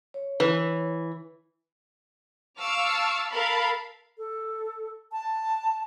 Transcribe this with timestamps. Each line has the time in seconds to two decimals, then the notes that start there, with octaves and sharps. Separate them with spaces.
0.14 C#5
0.40 E3 B4
2.57 F5 A5 C#6 D6 E6 F6
3.30 A4 A#4 F5 A5 B5
4.17 A4
5.12 A5